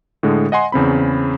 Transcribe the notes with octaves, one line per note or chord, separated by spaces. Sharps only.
A2 D3 G#3
D#5 F#5 G#5 C6
E2 C#3 C4 B5